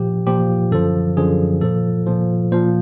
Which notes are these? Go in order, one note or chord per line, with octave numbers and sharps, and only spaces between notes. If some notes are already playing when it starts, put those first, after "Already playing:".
Already playing: A#2 F3 G4
A#2 F3 G4
F#2 D3 F3 A4
F#2 D3 F3 G#4
A#2 F3 A4
A#2 F3
A#2 F3 C5